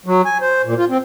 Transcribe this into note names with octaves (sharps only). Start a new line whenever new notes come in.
F#3
G#5
C5
A#2
F4
C4